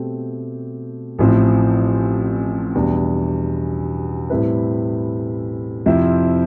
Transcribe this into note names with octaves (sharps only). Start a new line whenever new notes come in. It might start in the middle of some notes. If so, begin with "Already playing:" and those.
Already playing: B2 A3 C4 G4
A1 A2 F3 C4
E2 B2 G3 D4
A2 G3 C4 E4 B4
F2 C3 F3 C4 E4